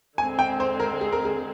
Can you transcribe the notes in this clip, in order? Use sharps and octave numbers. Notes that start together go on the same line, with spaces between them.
D3 G#3 C4 G#5
G5
C5
A#4
G#4
A#4
G#4